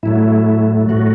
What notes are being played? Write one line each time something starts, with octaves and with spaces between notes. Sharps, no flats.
A2 F#3 A3 E4
A2 F#3 A3 F#4